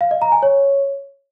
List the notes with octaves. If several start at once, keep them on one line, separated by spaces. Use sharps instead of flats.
F5
D#5
A#5
G#5
C#5